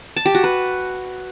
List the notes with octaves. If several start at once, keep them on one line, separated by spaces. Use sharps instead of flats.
A5
G4
F#4
B4